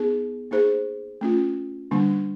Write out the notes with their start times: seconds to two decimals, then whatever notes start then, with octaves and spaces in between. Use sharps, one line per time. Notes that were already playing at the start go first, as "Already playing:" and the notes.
Already playing: B3 D#4 G#4
0.51 A#3 D#4 G#4 C5
1.21 A3 C#4 F4
1.91 D3 G3 A#3 D4